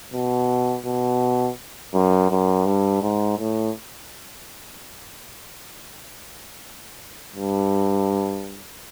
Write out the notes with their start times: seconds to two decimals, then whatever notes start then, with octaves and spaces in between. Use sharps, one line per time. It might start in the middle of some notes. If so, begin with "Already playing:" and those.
0.14 B2
0.86 B2
1.94 F#2
2.31 F#2
2.65 G2
3.02 G#2
3.39 A2
7.36 G2